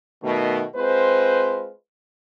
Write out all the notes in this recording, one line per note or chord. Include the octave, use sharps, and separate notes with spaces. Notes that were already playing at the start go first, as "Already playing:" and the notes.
B2 D#3 A3
G#3 C4 F4 B4 C5